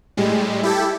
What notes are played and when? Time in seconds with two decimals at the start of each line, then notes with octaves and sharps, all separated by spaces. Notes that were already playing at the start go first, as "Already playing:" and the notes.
0.17 A2 G3 G#3
0.63 E4 G4 A4